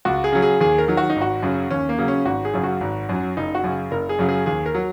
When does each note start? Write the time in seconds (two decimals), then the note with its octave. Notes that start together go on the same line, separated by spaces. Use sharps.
0.05 C#2 F#4
0.24 G#4
0.32 C#3 F#3
0.42 G#4
0.61 D#2 G#4
0.78 A#4
0.88 D#3 F#3
0.97 F#4
1.10 D#4
1.16 G#1
1.21 F#4
1.43 F#2 C#3 F#3
1.70 D#2 C#4
1.89 A#3
1.98 C#3 F#3
2.08 C#4
2.25 G#1 F#4
2.45 G#4
2.54 F#2 C#3 F#3
2.63 F#4
2.81 G#1
3.09 F#2 F#3
3.37 F#1 D#4
3.55 F#4
3.64 F#2 C#3
3.91 F#1 A#4
4.09 G#4
4.19 F#2 C#3 F#3
4.29 G#4
4.46 D#2 G#4
4.66 A#4
4.74 F#3